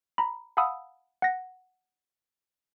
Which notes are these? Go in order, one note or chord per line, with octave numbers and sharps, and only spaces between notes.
A#5 B5
F5 F#5 A5 B5 D#6 E6
F#5 A#6